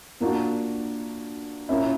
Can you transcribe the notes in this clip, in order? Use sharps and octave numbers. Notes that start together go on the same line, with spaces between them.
A#2 A#3 D4 F#4
A#2 A#3 C#4 E4